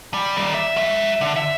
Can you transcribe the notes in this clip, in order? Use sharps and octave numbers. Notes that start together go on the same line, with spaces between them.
G3
D#3 D5
E5
F#3 E5
D3
E5